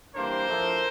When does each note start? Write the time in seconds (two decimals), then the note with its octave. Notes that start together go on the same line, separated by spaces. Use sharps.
0.16 E3 G3 A#3 D4 A#4 C5
0.48 A2 F3 A3 D4